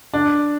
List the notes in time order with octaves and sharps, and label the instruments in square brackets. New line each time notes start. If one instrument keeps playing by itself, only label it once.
[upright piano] D4